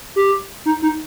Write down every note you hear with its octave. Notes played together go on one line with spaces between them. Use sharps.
G4
D#4
D#4